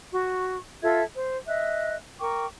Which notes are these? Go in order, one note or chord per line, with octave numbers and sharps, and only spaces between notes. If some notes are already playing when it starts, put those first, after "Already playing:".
F#4 C#6
F4 A4 E5 G#6
C5
D#5 E5 F#6
A#4 G5 C#6 D6